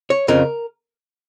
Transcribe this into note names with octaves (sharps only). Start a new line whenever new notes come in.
C#5
F2 C#3 F3 A#4